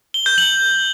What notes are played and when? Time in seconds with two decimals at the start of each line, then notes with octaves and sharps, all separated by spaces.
0.14 G7
0.26 G6
0.38 F#7